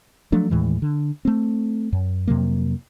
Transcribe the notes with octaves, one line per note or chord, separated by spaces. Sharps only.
F3 F#3 A3 D4
D#2 A2 E3 G#3
D3
A3 C4
F#2
F2 C3 F#3 A#3